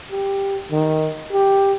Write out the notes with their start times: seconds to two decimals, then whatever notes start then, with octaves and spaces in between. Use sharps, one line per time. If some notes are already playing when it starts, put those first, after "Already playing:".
0.12 G4
0.71 D#3
1.32 G4